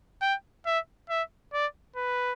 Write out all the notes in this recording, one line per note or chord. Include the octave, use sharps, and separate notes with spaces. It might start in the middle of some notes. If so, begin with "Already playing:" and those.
G5
E5
E5
D5
B4